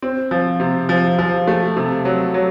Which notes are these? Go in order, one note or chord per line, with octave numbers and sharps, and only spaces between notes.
C4
F3
C3
F3
F3
A3
C3
F#3
F#3